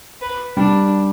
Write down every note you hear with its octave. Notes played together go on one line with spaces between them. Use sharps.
B4
G3 D4